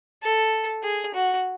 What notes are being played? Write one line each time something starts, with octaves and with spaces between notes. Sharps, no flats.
A4
G#4
F#4